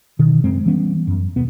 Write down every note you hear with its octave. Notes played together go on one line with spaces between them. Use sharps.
B2 D#3
F#2 C#3 G#3 C4
E3 G3 B3 C#4
F#2
D#2 B2 B3